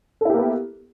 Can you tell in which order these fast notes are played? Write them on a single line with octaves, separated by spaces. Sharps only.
A4 E4 G4 A#3 B3